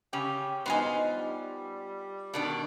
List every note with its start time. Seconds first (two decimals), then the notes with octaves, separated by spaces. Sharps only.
0.13 C#3 C#4 G4
0.66 B2 B3 D#4 F4 C5 G#5
1.17 G3
2.34 B2 D#3 D4